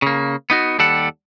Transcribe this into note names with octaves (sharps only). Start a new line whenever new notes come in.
C#3 A#3
B3 D#4 F#4
D#2 G3 A4 F#5